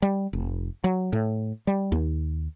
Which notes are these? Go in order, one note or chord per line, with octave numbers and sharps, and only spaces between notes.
G3
F1
F#3
A2
G3
D#2